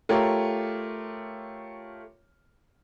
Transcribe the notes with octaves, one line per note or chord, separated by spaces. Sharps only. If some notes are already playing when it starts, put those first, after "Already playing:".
A3 F4 G4 A#4 C#5